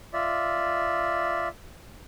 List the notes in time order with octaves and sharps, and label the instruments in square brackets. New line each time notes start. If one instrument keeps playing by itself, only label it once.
[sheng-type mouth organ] F4 D5 E5